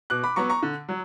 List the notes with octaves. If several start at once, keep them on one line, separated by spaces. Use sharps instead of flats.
B2 D6 F#6
B5 D6
F#3 B3 A#5 C#6
A#5 C#6
D3
F#3